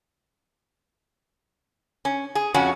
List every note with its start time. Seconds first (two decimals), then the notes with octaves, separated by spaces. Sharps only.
2.05 C#4
2.35 G#4
2.54 F2 C#4 F#4